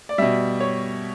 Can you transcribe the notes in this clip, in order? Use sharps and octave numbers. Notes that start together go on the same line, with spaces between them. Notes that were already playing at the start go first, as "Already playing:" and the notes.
D5
B2 G3 E5
C#5